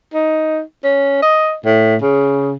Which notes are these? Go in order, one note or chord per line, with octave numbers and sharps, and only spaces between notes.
D#4
C#4
D#5
A2
C#3